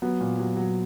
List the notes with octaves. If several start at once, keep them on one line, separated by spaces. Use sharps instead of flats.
F#3 B3
A#2
F#3
F#3